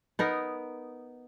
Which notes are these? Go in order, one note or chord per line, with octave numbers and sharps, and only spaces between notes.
B3 D#4 A#4